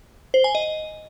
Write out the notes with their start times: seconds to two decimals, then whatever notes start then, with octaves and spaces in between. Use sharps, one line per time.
0.34 C5
0.44 G#5
0.55 D#5